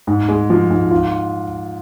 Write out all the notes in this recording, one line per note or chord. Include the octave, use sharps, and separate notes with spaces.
G#2
G#3
F3
G#2
F4